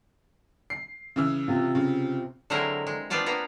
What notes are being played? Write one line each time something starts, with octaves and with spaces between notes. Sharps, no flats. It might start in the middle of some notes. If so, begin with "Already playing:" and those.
C7
C#3 E3 E6
C3 F4
C#3
D3 F#3 G#3 C4 E4 A#4
G#3
B3 C4 D4 F4 D5 F#5
A#3 B3 A#5